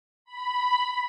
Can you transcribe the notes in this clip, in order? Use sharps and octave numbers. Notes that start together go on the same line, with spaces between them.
B5